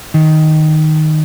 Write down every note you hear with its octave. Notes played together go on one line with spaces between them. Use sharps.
D#3